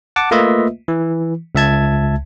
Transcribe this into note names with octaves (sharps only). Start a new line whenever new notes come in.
F#5 A5 D6
A3 A#3 F4 B4 D#5 E5
E3
C#2 E5 A5 G#6